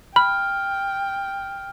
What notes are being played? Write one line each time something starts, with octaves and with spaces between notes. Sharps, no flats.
G5 B5 F6